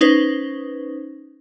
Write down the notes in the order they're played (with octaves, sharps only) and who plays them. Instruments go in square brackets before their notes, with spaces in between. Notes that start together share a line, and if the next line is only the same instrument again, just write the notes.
[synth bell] C#4 D#4 B4 C5